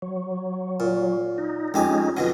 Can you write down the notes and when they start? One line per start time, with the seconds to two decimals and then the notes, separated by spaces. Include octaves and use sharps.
0.02 F#3
0.80 A#2
1.38 D#4
1.74 F2 G#3 C#4 D#4 G4 G#5
2.17 F2 B2 F#3 D#5